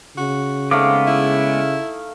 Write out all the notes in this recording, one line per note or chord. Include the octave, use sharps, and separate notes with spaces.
C#3 F#4
G#3 A3 B3 C4 D#4 F5 D6
E4